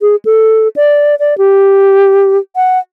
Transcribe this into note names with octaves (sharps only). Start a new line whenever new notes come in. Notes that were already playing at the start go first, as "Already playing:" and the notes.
G#4
A4
D5
D5
G4
F#5